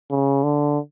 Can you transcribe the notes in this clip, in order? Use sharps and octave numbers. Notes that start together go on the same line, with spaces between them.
C#3
D3